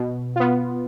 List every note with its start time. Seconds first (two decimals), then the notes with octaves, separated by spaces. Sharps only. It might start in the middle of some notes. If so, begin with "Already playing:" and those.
Already playing: B2
0.36 B3 F4